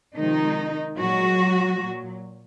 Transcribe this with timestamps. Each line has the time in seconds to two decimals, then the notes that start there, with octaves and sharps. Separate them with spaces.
0.17 C3 D#3 F3 G#3 D#4
0.98 A#2 F#3 G#3 F#4
1.78 A#2 F#3